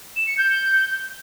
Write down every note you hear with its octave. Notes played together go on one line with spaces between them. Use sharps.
E7
C#7
G6